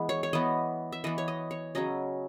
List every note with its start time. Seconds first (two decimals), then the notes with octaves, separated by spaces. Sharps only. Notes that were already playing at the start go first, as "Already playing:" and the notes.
Already playing: E3 G#3 B3
0.09 C#5
0.23 C#5
0.33 E3 B3 D#5
0.92 E5
1.04 E3 B3 D#5
1.18 C#5
1.28 D#5
1.51 C#5
1.75 C#3 F#3 C#4 D#5